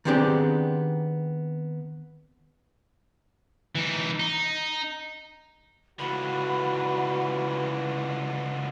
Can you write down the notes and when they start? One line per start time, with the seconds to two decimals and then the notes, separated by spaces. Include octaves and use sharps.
0.05 D#3 B3 C4 D4 G4 G#4
3.75 E3 D#4
4.19 D#4
5.99 C#2 D3 E3 F#4 B5